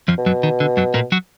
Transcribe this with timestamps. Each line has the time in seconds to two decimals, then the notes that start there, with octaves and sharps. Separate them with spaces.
0.08 F2 F3
0.18 B2
0.26 F#2 F#3
0.43 D#3
0.60 D3
0.77 F#2 F#3
0.94 A#2 A#3
1.12 F#3 F#4